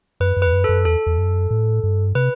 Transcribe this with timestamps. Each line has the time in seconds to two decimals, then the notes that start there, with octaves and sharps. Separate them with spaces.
0.20 F#2 B4
0.36 F#2
0.42 E2 B4
0.53 F#2
0.64 F#2 A4
0.85 E2 A4
1.06 E2
1.18 F#2
1.51 A2
1.83 G2
2.15 C3 B4